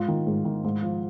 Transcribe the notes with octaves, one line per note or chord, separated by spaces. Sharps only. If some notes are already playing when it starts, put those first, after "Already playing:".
Already playing: G#2 F4
D#3
G#2
D#3
G#2
F3